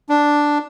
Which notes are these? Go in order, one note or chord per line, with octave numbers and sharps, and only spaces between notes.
D4